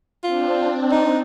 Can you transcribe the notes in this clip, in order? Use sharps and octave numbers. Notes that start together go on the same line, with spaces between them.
C4 D4 F4
D#4